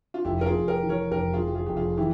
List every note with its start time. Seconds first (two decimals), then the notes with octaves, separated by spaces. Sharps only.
0.14 F4
0.25 F1 E4 G4
0.41 A#4
0.46 F4 G#4
0.54 F1
0.68 G4 A#4
0.83 E3
0.89 A#4 C#5
1.11 F1 G4 A#4
1.33 F4 G#4
1.41 F1
1.47 G4
1.55 F4 G#4
1.66 F1 G4
1.77 F4 G#4
1.97 E3 E4 G4